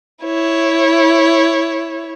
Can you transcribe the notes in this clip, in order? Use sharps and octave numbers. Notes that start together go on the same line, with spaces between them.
E4 C#5